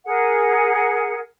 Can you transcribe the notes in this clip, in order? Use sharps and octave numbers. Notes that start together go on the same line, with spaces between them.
G#4 A#4 F#5 G#5